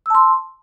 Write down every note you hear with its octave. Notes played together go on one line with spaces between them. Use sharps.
A5 C6 E6